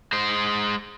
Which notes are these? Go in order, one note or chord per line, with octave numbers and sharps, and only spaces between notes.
G#3 C5